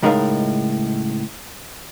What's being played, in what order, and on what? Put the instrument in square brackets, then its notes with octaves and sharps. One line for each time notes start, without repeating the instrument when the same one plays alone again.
[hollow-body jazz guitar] C#2 A2 G#3 D#4 A#4 F5